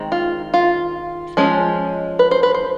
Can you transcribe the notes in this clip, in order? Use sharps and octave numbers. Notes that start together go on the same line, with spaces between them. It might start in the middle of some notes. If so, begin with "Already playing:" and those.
Already playing: D#3 G#3 C4
F4
F4
F3 G#3 C#4
B4
C5
B4
C5